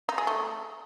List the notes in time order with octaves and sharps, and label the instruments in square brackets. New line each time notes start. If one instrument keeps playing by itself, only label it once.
[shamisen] D#4
G#4
A3